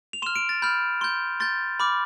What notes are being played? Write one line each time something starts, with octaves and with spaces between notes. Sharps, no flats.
F7
C6 F6 E7
D7
A6
B5 F6 G6
C6 G6
C6 G6 A6
B5 D6 F6